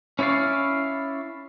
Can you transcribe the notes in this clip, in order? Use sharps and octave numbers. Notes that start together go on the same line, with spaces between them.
C#4 E4 C#5 D5 F5